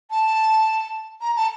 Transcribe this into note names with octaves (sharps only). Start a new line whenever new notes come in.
A5
A#5
A5